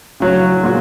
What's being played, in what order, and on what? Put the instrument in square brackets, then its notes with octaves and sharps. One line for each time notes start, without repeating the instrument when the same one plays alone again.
[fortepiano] C#3 F#3 C#4
A#2 G#3 F#4